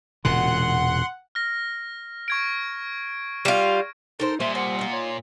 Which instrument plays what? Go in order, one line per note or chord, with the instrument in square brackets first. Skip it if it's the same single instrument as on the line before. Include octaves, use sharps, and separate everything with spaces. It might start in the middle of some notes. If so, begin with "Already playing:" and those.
[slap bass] E1 A#2 C#3 [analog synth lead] F#5 [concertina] C6
[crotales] F6 A#6
C#6 G#6 D7
[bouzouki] G3 F4
[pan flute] D#4 [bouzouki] A4 A#4 C5
[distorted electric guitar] A#2 [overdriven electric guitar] G3 C6 [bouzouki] C5 [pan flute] E5
[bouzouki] C4 [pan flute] F#5
[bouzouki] D#4 F4
[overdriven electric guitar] C#5